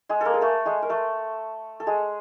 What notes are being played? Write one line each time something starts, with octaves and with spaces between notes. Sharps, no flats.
G#3 G#4
A#3 A4 A#4
G#4
A3 A4
G#3 G#4
A#4
A3 A4
A4
G#3 G#4